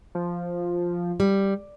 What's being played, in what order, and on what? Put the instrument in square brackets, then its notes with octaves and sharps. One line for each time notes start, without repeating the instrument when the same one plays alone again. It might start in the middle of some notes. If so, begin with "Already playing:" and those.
[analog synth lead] F3
[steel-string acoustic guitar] G3